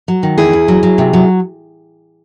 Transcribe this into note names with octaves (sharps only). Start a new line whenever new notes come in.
F#3
D#3
E2 E4 G#4
E2
F#3
F#3
C3
F#3